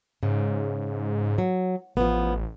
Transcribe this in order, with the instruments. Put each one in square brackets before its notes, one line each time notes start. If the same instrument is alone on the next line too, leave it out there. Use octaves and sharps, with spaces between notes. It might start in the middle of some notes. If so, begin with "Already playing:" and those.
[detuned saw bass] G#2 [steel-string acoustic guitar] C#3
[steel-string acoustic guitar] F#3
[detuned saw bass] A1 [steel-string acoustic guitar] F3 B3